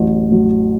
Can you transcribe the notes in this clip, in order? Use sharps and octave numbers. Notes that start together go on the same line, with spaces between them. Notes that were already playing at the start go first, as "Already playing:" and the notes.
Already playing: A1 A2 F#3
A2 F#3